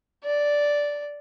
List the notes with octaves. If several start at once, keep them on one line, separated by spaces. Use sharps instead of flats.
D5